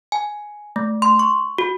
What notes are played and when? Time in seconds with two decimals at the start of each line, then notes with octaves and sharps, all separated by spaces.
0.12 G#5
0.76 A3
1.02 C6
1.19 C#6
1.58 F#4